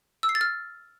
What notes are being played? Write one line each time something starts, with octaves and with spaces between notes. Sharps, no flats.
E6
C7
A6
F6